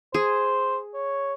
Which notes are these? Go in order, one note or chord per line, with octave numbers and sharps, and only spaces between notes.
G#4 C5
C#5